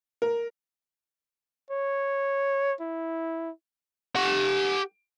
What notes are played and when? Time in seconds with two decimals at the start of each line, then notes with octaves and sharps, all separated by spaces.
0.22 A#4
1.71 C#5
2.81 E4
4.16 G4 F#5